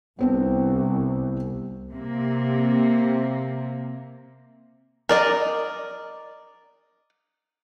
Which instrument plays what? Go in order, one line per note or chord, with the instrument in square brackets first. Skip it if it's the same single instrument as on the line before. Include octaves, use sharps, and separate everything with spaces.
[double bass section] C2 [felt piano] B3 C4 D4
[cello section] C3 A#3
[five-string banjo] A#4 D5 D#5